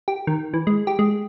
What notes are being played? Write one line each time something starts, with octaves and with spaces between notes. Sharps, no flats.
G4
D#3
E3
G#3
G4
G#3